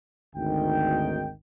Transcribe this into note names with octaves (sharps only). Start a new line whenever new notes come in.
G#1 D2 D#3 G5